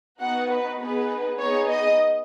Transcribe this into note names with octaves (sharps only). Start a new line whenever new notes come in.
B3 D#4 F#4 F#5
B4
B3 D#4 G#4 B4
B3 D#4 G#4 C#5
D#5